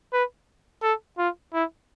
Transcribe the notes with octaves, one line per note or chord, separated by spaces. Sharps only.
B4
A4
F4
E4